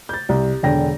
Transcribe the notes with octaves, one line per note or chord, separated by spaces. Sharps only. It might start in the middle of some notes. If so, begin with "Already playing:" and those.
G6 A6
C2
E1 D3 G5 A#6